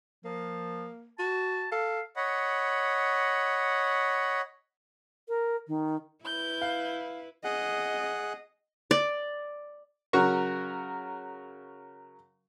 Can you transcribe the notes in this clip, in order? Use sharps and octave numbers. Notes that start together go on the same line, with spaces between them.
F3 A#3
F#4 A5
A4 F5
C#5 D#5 F#5 B5
A#4
D#3
E4 B4 G6
F5
G#4 D#5 F#5
D5
C#3 F#3 F#4 A#4 C#6